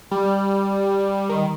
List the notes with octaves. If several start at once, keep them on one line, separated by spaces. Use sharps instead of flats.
G3
D#3